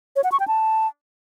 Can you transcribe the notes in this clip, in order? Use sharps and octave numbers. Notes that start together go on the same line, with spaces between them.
C#5
F#5
C#6
G5
A5